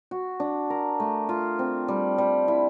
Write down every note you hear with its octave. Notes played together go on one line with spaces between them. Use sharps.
F#4
D4
A#4
A3
F4
C4
G3
G3
E4